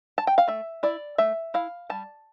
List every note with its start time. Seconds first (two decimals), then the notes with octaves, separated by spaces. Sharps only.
0.18 A5
0.27 G5
0.38 F5
0.48 A3 E5
0.83 E4 D5
1.18 A3 E5
1.54 E4 F5
1.90 G3 A5